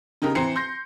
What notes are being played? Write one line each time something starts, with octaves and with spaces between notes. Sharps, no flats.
C#3 D#4 G4 A#4
E3 C4 C5 A#5 C7 C#7
C6 G6 A#6